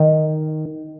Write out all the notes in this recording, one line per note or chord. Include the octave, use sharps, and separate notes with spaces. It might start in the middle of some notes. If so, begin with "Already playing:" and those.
Already playing: D#3